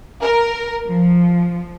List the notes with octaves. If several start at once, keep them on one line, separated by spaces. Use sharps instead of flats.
A#4
F3